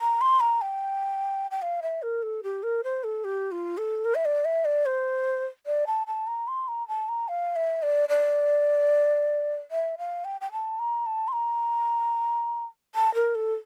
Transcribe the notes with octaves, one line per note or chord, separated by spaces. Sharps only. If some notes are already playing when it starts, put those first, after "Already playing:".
A#5
C6
A#5
G5
G5
F5
E5
A#4
A4
G4
A#4
C5
A4
G4
F4
A4
A#4
E5
D5
E5
D5
C5
D5
A5
A5
A#5
C6
A#5
A5
A#5
F5
E5
D5
D5
E5
F5
G5
G5
A5
A#5
A5
C6
A#5
A5
A#4
A4